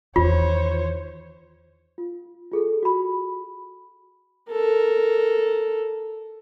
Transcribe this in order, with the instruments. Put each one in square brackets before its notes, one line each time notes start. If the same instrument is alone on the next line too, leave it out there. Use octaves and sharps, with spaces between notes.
[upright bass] E2 D#3 [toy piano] F4 [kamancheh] C5 C#5
[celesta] F4
F4 G#4 A4
F#4 B5
[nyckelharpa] A4 A#4